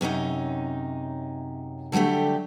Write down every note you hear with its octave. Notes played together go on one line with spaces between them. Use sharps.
F#2 C3 C#4 D#4
D3 F#3 G3 A3 G4